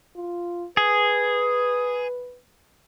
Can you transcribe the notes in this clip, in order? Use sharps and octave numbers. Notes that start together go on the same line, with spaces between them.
F4
G#4 B4